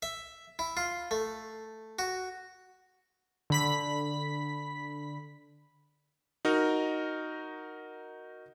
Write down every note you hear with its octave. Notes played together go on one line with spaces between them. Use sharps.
E5
E4
F4
A3
F#4
D3 B5 B6
D#4 F#4 A#4